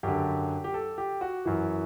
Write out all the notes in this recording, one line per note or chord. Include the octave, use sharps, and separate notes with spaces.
F#2 D3 G4
G4
A4
G4
F#4
F#2 E3